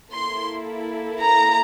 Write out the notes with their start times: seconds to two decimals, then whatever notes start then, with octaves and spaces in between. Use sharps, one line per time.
0.12 A#3 E4 A4 C6
1.23 A#5